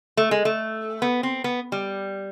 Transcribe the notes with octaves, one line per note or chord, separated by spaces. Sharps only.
A3
G#3
A3
B3
C4
B3
G3